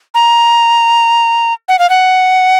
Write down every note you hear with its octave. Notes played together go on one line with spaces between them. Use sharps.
A#5
F#5
F5
F#5